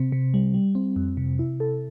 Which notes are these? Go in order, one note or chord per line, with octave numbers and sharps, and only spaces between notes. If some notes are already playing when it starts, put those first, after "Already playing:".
Already playing: C3 C4
C3
G3
G3
C4
F2
C3
E4
A4